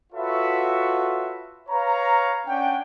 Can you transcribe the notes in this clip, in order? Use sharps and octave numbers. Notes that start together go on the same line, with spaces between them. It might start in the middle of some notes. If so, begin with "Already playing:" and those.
F4 F#4 A4 B4 C#5 E5
B4 C#5 F5 A#5
C#4 D4 F#5 G5